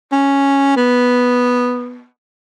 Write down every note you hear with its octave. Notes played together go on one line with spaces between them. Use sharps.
C#4
B3